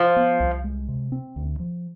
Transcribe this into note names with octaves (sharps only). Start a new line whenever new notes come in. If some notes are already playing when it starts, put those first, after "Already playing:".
Already playing: F3
B3
C2
G#3
C3
C4
D2
F3